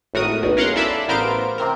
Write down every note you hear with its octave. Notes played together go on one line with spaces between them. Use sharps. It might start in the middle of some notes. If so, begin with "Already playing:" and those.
G#1 A2 F#4 A#4 D#6
B1 E2 B2
C#4 A#4 F5 F#5 A#5 C6
E4 A4 D5 E5 A5 B5
A1 B3 A#4 C5 F5 D7
C3 C4 A#4